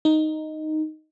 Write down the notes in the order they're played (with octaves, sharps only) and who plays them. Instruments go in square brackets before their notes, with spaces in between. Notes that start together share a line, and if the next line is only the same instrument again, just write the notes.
[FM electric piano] D#4